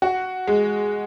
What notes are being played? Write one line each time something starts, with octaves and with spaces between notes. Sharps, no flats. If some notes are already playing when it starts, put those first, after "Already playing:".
F#4
G#3